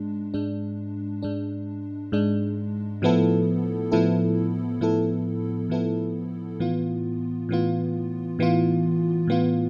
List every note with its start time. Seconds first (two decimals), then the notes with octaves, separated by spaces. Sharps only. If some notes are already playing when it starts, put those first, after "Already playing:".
Already playing: G#2 G#3 D4
0.34 G#2 G#3 D4
1.22 G#2 G#3 D4
2.12 G#2 G#3 D4
3.02 A2 F3 B3 E4 A4
3.92 A2 F3 B3 E4 A4
4.81 A2 F3 B3 E4 A4
5.70 A2 F3 B3 E4 A4
6.60 A2 E3 B3 F4
7.49 A2 E3 B3 F4
8.39 A2 E3 B3 F4
9.27 A2 E3 B3 F4